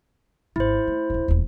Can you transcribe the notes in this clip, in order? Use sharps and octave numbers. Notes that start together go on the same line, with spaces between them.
G#1 E4 C5
A3
D1 G1
D#1 E2